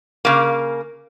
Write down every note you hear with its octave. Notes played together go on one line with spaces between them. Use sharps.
C#3 A#3